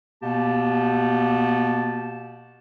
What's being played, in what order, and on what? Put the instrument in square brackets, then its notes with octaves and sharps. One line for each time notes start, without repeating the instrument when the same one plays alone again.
[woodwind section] B2 A#3 B3 G4 A5